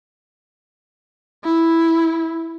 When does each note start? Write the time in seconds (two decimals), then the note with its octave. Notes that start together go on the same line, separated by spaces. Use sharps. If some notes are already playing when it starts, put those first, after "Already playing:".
1.45 E4